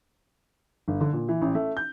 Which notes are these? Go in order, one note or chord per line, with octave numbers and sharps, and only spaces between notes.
G1
D3
A#2
E3
A1
A3
G6